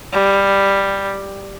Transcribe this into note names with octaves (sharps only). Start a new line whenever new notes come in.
G3